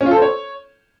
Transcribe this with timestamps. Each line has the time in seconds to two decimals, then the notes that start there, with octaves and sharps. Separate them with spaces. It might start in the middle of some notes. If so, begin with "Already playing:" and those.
0.01 C#4
0.06 F4
0.11 A4
0.16 C5
0.22 C#5